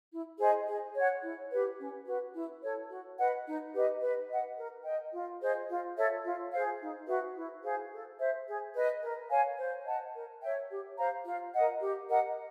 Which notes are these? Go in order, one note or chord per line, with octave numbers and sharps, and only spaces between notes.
E4
G#4 C5 D#5
G#4
C#5 F#5
E4
G4 B4
C#4
F#4 B4
E4
A4 C#5
F#4
B4 D#5 F#5
D#4
G4 B4 D#5
B4
D#5 F#5
A#4
D#5 G5
F4
G#4 C5 D#5
F4
A4 C#5 E5
F4
G#4 C5 F5
D#4
F#4 B4 E5
E4
G#4 C5 F5
A4
C5 E5
G#4
B4 D#5
A#4
C#5 F5 G#5
C5
D#5 F#5 A5
A#4
C#5 E5 G5
G4
C5 F5 A#5
F4
A#4 D#5 F#5
G4
A#4 D#5 F#5